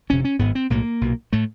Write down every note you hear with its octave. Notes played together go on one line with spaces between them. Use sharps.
G1 F2 C3 C#4
C#4
G#1 G#2 B3
C4
B1 A2 A#3
B1 A#2
A2 A3